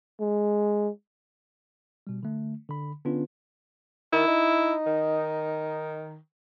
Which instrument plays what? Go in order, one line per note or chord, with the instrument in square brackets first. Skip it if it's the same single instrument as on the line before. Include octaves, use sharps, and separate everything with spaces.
[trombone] G#3
[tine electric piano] B2 G3
D3 A3
D3 B5
D3 B3 C#4 D4 F4 B4
[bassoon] D#3 [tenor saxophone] E4
[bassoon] D#4
[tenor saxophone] D#3